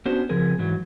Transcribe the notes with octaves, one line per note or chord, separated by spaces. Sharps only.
B3 C#4 D4 F#4 C5
C#3 F3 C4 G#4 A#4
G#2 E3 F#3